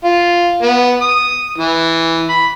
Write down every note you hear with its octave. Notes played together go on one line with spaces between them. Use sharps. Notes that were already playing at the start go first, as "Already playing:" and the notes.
F4
B3
D#6
E3
B5